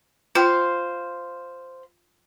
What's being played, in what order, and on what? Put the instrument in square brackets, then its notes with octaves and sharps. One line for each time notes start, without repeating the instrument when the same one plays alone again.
[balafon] F4 G5 [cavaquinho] C5 F5